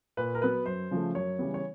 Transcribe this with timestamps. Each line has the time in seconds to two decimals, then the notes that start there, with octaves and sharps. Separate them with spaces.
0.17 A#2 B4
0.35 A#4
0.42 F#3 B3 B4
0.66 F#2 C5
0.91 C#3 F3 A3
1.15 F#2 C#5
1.39 C#3 E3 G3 B3
1.54 C#5